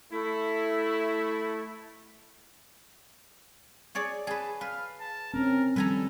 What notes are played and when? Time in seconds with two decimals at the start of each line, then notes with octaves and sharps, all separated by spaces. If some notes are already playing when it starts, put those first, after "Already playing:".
0.12 A3 E4
3.95 G#4 C#5 D5
4.27 G#4 B4 A5
4.61 B4 F5
5.01 A5
5.34 C4 C#4 A#4
5.76 D#3 F3 G3 A4 B4 G#5 A#5